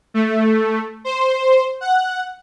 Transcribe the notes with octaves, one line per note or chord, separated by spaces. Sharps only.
A3
C5
F#5